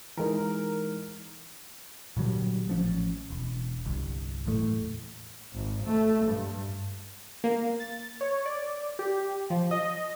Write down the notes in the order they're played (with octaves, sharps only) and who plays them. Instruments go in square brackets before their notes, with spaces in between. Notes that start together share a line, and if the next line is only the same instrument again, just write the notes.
[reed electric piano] E3 G#3 D#4 [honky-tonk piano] A#4
[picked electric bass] A#2 D3 F#3 G3
A1 F3 C#4
E1
G1 C2
F#1 E2 A2 A3
[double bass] G#1
A3
G2
[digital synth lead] A#3
A6
C#5
D5
G4
F3
D#5